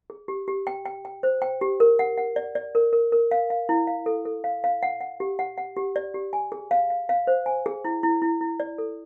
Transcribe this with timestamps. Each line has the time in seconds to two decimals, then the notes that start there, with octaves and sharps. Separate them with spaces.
0.10 G#4
0.28 G4
0.48 G4
0.67 G5
0.86 G5
1.05 G5
1.23 C5
1.42 G5
1.61 G4
1.80 A#4
1.99 F#5
2.18 F#5
2.36 D5
2.55 D5
2.75 A#4
2.93 A#4
3.12 A#4
3.31 F5
3.50 F5
3.69 E4
3.87 F5
4.06 A4
4.25 A4
4.44 F5
4.64 F5
4.83 F#5
5.01 F#5
5.20 G4
5.39 F#5
5.58 F#5
5.77 G4
5.96 D5
6.14 G4
6.33 G#5
6.52 G#4
6.71 F5
6.90 F5
7.09 F5
7.27 C5
7.46 G#5
7.66 G#4
7.85 E4
8.03 E4
8.22 E4
8.41 E4
8.60 D5
8.78 A4